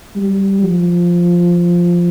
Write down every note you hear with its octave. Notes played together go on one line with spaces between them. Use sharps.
G3
F3